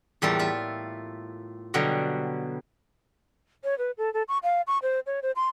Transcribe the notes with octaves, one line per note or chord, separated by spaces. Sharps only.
E2 A2 G3 A#3 F4 A4
F4 E5
B2 D3 F#3 G3
C#5
B4
A4
A4
C#6
F5
C#6
C5
C#5
C5
C6